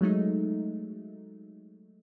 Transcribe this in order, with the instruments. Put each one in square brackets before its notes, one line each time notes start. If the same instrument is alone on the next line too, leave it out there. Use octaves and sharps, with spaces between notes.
[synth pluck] F#3 G#3 A3 D#4